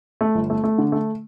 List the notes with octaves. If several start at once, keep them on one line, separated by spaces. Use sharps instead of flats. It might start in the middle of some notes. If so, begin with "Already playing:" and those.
A3
G1
A3
A3
D3
A3